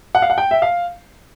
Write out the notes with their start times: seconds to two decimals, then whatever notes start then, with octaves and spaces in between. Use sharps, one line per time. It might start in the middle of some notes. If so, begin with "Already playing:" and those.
0.15 F#5
0.22 F5
0.30 F#5
0.38 G5
0.51 E5
0.62 F5